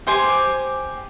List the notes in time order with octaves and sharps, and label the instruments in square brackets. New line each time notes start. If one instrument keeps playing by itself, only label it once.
[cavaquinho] G4 C5 G#5 D6